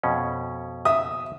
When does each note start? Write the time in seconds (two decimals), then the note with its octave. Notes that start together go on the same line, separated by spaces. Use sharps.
0.03 F2 B2 C#4
0.85 E5 D#6